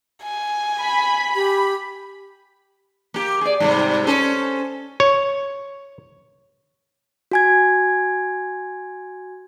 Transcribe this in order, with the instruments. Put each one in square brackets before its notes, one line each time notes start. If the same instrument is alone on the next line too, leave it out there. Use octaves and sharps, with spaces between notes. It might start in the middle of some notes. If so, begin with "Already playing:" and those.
[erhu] G#5
[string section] B5
[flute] G4
[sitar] A#3 G4
G#4 D5
G#2 C3 G3
C#4 A4 C5
[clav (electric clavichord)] C#5
[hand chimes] F#4 G#5 G#6